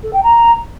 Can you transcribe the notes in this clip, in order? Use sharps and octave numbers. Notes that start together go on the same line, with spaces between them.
A4
G5
A#5